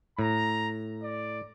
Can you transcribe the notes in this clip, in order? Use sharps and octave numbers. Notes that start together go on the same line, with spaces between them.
A2 A#5
D5